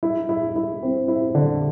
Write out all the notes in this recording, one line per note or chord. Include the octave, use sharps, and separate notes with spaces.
E4
E4
E4
C4
E4
D3